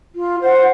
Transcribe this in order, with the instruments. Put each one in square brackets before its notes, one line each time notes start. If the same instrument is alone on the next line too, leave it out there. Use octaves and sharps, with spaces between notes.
[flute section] F4
C5 F#5